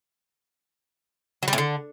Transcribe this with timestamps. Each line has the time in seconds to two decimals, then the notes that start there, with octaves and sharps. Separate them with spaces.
1.43 F#3
1.48 G3
1.53 A2
1.58 D3